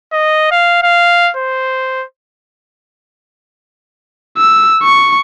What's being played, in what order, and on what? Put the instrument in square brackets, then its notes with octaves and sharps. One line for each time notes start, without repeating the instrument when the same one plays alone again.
[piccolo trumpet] D#5
F5
F5
C5
[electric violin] E6
C#6